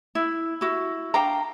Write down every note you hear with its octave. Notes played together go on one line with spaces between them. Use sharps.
E4
E4 F#4
D4 F5 G5 A#5